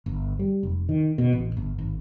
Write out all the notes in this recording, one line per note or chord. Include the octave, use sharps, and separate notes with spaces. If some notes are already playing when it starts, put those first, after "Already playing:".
G1
G3
F1
D#3
B2
A1
G1
G#1